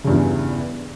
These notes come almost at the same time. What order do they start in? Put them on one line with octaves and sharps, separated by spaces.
C#3 G2 E2 E3